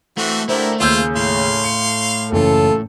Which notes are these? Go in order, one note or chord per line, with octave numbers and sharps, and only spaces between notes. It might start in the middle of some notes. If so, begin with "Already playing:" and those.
E3 A3 C4 F#4
D3 A3 E4 G4 A#4 C5
D#2 C#3 F4 C5 E6 G6
A2 F5 C6
C#7
F#1 E3 C#4 F4 A4